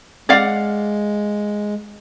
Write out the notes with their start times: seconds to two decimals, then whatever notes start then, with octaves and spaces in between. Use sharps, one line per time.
0.29 G#3 D5 F5 F#5